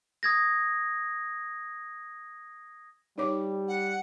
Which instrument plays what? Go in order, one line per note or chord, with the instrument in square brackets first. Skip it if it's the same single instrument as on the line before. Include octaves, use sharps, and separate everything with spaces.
[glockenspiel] D#6 G#6 A#6
[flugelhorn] G3 [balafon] D#4 C#5 D6
[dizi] F#5